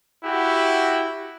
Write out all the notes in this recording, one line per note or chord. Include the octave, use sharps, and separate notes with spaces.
E4 F#4 G4 F#5